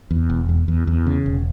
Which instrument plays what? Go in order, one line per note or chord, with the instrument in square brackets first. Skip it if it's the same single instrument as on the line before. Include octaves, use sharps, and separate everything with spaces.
[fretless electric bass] E2
E1
E2
E2
E2
C#3
E1